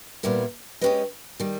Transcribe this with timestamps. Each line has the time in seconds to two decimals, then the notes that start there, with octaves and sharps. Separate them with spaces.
0.23 A#2 G3 B3 E4 A#4
0.81 G#3 C#4 G4 B4 D#5
1.40 D#3 G3